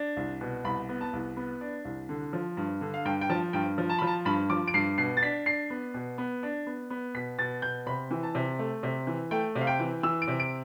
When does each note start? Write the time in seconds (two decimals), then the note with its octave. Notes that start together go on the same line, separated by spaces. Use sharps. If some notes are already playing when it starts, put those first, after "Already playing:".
Already playing: D4
0.17 C2
0.41 B2
0.64 C2 B5
0.89 B3
1.01 A5
1.13 C2
1.37 B3
1.61 D4
1.85 C2
2.09 D3
2.33 F3
2.57 G2
2.81 D3
2.94 F5
3.05 G2 G5
3.21 G5
3.30 F3 A5
3.53 G2 G5
3.78 F3
3.89 A5
3.99 F3 B5
4.07 A5
4.25 G2 B5
4.50 F3 D6
4.68 D7
4.74 G2 C7
4.98 B2 C7
5.17 A6
5.22 D4 B6
5.46 D4 C7
5.70 B3
5.94 B2
6.18 B3
6.43 D4
6.67 B3
6.90 B3
7.15 B2 B6
7.39 B2 A6
7.62 B2 G6
7.86 C3 B5
8.11 E3
8.23 A5
8.35 C3
8.59 A3
8.83 C3
9.07 E3
9.31 A3 G5
9.55 C3
9.61 F5
9.67 G5
9.79 E3
10.03 E3 E6
10.22 D7
10.28 C3
10.40 D7